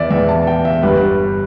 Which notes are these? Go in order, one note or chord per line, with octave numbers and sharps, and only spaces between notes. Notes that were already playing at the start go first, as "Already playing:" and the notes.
Already playing: E2 E3 B3 D5 E5
E2 E3 B3 E5
A5
G5
E5
G1 G2 G3 B4